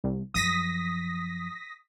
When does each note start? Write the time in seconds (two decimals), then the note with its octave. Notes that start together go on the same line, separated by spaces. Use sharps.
0.04 C2
0.34 F#2 F3 D#6 A#6 B6